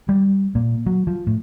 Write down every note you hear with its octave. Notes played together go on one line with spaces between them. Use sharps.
G3
A#2
F#3
F3
A2